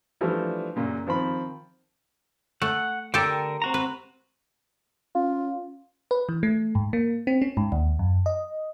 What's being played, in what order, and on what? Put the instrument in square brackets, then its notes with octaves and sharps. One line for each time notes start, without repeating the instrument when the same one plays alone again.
[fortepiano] E3 F3 G3 A3 D4
F#2 A#2 C#3
D#3 F3 C4 B5
[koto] A3 [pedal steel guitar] F#5
[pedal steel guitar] D3 D4 A#4 [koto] G4 A4
[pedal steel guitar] C4 F#4 A#5
[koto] B4
[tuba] C#4 [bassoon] F4
[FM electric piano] B4
E3
A3
G#2
A#3
C4
C#4
G#2
D#2
F#2
D#5